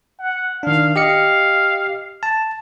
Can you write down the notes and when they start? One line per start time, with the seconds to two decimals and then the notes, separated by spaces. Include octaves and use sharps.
0.19 F#5
0.63 D#3 D4 F5
0.96 G4 D#5 F5 C#7
2.23 A5